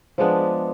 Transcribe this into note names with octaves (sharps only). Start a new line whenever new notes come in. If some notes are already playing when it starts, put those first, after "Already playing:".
F3 G#3 B3 D4